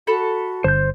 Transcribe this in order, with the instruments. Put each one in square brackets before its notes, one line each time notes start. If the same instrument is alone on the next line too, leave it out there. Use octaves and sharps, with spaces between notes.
[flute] F#4 [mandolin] A4 A5 B5
[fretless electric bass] G1 D3 [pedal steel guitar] C5 G6